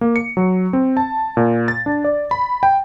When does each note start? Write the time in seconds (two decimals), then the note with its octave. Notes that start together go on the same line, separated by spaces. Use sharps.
0.01 A#3
0.16 C#7
0.37 F#3
0.73 C4
0.97 A5
1.37 A#2
1.68 A6
1.86 D4
2.04 D5
2.31 B5
2.63 G5